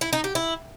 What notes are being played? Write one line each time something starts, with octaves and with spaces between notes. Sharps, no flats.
E4
D#4
G4
E4